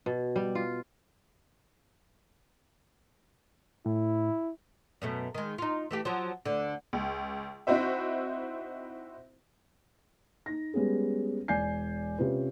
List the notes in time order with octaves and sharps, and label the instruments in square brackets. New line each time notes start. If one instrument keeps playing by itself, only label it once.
[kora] B2
G3
F4
[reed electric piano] A2 [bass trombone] E4
[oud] F#2 B2 A3
D#3 G#3
D#4 F4
E3 A3 G4
F3 F#3
D2 D3
[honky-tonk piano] C#2
C4 D#4 E4 F#4 C5 E5
[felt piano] D#4 A#6
G3 G#3 B3 C#4 G#4
E1 D5 G#5 G6 C7
C3 C#4 F4 B4